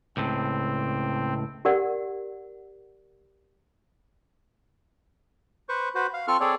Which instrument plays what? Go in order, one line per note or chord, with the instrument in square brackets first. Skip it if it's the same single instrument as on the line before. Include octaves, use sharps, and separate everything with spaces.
[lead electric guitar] C#2 A2 [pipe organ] C4
[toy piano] G4 A#4 D5 F#5
[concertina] B4 C5 C#6
F#4 B4 C5
F5
C4 F4 A4 C#6 F6
C4 G#4 A4 C#5 D5